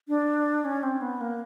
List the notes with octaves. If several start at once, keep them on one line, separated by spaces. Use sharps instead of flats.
D4
C#4
C4
B3
A#3